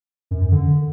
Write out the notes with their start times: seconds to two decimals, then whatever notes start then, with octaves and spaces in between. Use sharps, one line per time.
0.31 F#2
0.41 F#2
0.52 D3